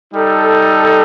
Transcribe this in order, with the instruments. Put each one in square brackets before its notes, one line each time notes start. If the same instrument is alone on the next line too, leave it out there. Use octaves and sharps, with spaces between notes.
[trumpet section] G3 D#4 A4